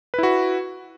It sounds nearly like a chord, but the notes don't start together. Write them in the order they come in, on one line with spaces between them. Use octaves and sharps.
B4 E4 F#4